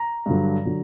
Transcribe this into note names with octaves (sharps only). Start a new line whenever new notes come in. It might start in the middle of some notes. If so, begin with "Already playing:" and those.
Already playing: A#5
G2 D3 F#3
D3 F#3